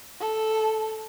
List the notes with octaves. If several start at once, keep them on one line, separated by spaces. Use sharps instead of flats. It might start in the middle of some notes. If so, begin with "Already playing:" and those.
A4